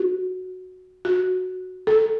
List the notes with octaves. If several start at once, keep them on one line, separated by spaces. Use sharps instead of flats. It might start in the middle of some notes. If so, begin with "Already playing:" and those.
Already playing: F#4
F#4
A4